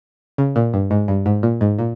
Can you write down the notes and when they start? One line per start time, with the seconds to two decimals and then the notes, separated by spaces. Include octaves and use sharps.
0.38 C#3
0.56 A#2
0.74 G2
0.91 G#2
1.08 G2
1.26 G#2
1.43 A#2
1.61 G#2
1.79 A#2